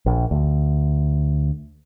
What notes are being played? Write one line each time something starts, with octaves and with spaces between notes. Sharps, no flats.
A#1
D2